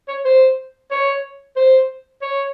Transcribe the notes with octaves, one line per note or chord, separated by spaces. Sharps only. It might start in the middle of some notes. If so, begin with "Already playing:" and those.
C#5
C5
C#5
C5
C#5